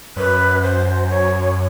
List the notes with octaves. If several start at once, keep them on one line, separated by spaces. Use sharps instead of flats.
F#2 B4
C5
C#5